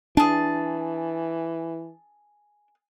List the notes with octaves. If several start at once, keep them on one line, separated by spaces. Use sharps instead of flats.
E3 D4 G#4 A5